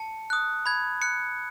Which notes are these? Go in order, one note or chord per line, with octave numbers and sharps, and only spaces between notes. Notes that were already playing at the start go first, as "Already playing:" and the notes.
Already playing: A5 C#7
D#6 F#6
B5 G#6
F#6 C#7